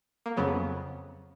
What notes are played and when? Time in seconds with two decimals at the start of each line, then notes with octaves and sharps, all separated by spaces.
0.26 A#3
0.36 F2 C#3 F#3 B3